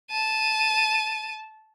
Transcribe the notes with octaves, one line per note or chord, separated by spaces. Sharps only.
A5 D#7